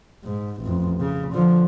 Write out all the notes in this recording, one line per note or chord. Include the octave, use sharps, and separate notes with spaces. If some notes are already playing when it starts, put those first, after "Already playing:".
G#2
A1 F2
C#3
D3 F3